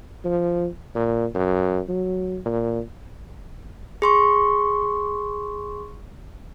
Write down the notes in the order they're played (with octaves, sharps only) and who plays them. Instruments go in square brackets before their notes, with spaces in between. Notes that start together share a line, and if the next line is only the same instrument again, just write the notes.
[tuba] F3
A#2
F#2
F#3
A#2
[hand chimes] G#4 C6 C#6